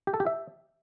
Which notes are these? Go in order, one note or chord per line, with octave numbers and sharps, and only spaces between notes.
G4
A4
G4
E5